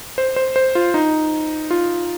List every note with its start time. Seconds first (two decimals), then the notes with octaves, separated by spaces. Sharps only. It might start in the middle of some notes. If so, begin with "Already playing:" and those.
0.18 C5
0.36 C5
0.56 C5
0.75 F4
0.94 D#4
1.71 F4